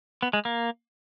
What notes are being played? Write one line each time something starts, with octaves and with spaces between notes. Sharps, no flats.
B3
G#3
A#3